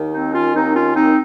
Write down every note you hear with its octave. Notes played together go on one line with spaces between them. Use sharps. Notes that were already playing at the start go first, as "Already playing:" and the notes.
Already playing: D#2 D#3
C4 D#4
C#4 F4
D#2 D#3 C4 D#4
C#4 F4
C4 D#4